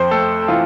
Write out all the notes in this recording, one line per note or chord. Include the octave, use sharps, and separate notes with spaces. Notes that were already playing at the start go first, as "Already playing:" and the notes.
Already playing: F2 C5
A3 A4
E3 F4